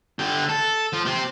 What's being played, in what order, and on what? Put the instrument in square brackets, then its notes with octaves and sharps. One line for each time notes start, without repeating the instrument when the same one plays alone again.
[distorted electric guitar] D3 G4
A4
F3
C4 G4